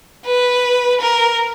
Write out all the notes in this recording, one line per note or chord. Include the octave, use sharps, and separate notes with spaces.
B4
A#4